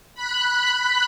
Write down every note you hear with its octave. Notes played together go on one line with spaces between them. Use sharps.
B5 F#6